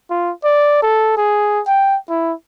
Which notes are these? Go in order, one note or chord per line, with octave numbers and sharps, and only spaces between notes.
F4
D5
A4
G#4
G5
E4